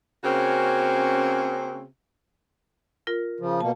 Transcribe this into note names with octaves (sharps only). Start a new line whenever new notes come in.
C#3 A#3 C4 C#4 F#4
F4 A#4
C#3 F3
B2 A#3 A5